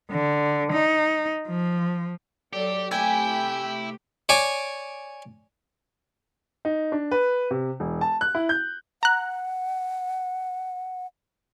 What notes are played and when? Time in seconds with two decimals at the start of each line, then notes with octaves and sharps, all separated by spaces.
0.11 D3
0.72 D#4
1.48 F3
2.53 F#3 G4 A4 D5
2.91 C3 A3 E4 G4 G5 G#5
4.29 C#5 D5 G#5
6.65 D#4
6.92 D4
7.11 B4
7.51 C3
7.80 E1
8.01 A5
8.21 F#6
8.35 E4
8.49 G6
9.03 F#5 A#5 F#6